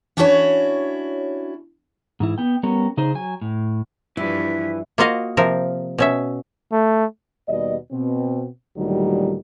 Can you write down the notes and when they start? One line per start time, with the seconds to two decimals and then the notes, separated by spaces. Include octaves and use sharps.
0.17 C#4 D4 E4 F#4 A#4 C#5
2.20 G#2 E3 E4
2.38 B3 G5
2.63 G3 B3 C#4 A#4
2.97 C#3 D#4 G#4 C5
3.14 F#3 G#5
3.41 A2
4.17 G2 E3 F3 E4 B6
4.98 A#3 F4 F#4 D#5 F5
5.37 C3 F3 A#4
5.98 B2 C#4 E5
6.72 A3
7.48 D#2 B2 G3 D5 D#5
7.92 B2 C4
8.77 D2 A#2 D#3 F#3 G3